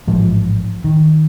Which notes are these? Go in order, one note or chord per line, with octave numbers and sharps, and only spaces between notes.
A1 G#2 F3
D#3